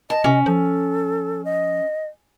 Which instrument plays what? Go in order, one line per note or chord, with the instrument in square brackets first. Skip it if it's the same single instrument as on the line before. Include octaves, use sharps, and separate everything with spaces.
[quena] D#5 [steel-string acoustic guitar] A5
[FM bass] C3 [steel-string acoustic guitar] C#4
[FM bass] F3 [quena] A4
[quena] D#5